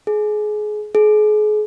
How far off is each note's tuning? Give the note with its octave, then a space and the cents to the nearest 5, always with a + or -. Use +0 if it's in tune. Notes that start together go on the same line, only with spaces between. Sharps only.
G#4 +25
G#4 +35